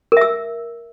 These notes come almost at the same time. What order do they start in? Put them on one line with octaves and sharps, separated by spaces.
A#4 E5 E6